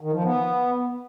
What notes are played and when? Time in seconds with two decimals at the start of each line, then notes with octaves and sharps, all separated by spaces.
0.01 D#3
0.13 F3
0.24 B3